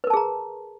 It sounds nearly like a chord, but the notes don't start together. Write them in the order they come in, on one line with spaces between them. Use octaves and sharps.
B4 A#4 A5 G#4 A#5